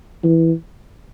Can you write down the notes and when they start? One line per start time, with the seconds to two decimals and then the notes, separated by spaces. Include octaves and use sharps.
0.24 E3